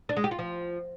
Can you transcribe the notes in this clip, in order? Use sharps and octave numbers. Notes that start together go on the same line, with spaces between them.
D4
G#3
G4
F4
F3